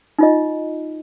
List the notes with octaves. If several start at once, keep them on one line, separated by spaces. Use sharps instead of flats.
D#4 F4 D#5